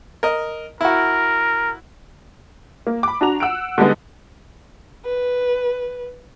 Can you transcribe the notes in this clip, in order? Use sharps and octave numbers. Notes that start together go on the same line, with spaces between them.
A#4 D#5
E4 F#4 A#4
A#3
B5 D6
D4 F#4 A#5 F7
F#5 E6 F#6 D7
D3 G3 G#3 B3 D#4
B4